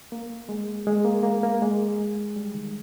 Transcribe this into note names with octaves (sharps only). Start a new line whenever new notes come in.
A#3
G#3
G#3
A#3
A#3
A#3
G#3
G3
D#3